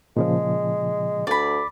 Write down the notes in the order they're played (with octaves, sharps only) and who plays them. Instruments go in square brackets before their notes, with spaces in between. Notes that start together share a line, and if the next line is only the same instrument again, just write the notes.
[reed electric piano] A#2 C#3 F3 [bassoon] G#3
[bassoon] D2 [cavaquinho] D5 B5